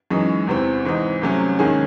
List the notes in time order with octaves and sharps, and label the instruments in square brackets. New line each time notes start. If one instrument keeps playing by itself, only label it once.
[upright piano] F#2 E3 G#3 D#4
E2 C3 E3 C4
G#2 E3 C4 D#4
C2 C3 F#3 A3 C#4
D#2 D#3 G#3 C#4 G#4